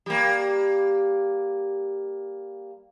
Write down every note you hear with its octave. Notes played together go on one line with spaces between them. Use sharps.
G3 A#3